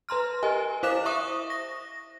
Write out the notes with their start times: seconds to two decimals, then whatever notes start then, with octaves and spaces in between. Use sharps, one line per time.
0.09 B4 A#5 C6 F6
0.43 G4 A#4 D#5 G#5
0.83 E4 C5 F5 D6 F#6 E7
1.05 E5 C#6 D#6
1.50 A#6